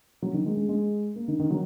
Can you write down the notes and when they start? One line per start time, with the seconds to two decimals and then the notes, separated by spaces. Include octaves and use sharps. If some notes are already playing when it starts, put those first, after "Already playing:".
0.22 F#3
0.34 D#3
0.46 G#3
0.57 G#3
0.69 G#3
1.16 A#3
1.28 D#3
1.39 D#3
1.50 F#3